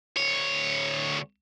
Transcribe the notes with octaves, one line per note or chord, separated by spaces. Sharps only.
D2 C#5